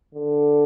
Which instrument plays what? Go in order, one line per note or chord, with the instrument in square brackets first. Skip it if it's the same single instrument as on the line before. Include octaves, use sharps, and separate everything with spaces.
[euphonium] D3